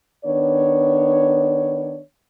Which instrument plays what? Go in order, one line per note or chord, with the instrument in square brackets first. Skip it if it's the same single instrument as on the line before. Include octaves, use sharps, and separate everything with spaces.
[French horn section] D#3 B3 D4 C#5